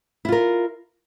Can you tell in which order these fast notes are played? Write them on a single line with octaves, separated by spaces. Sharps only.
E4 F4 A#4